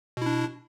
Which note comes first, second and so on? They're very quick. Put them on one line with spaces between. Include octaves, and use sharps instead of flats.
B2 E4 D4